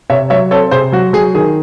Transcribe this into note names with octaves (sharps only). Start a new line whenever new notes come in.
C3 C#5 E5
F#3 C#5 E5
C4 A4 C#5
C3 G#4 C5
F#3 F#4
F#3 G#4
D#3 G#4